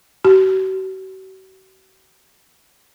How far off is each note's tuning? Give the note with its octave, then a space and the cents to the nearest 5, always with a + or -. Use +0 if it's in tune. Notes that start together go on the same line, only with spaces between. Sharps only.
F#4 +45